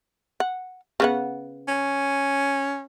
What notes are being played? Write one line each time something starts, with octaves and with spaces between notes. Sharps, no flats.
F#5
C#3 B3 F#5
C#4